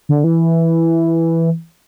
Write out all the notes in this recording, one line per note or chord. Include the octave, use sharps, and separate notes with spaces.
D3
E3